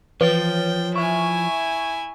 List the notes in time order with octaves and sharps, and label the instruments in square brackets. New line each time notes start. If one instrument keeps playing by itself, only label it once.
[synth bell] E3 C#5 A6 [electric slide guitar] F3 [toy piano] B4 [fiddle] G5
[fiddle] E4 G#5 [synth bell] E5 C#6